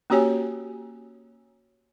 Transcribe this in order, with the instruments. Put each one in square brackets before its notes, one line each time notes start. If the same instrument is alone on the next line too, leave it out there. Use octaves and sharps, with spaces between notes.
[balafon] A#3 C#4 F#4 G4 C#5 G#5